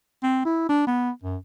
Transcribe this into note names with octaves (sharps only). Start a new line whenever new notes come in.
C4
E4
D4
B3
F#2